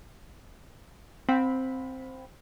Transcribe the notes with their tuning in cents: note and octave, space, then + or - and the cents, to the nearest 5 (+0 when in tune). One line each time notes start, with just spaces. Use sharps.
C4 +0 F5 +40 B5 +0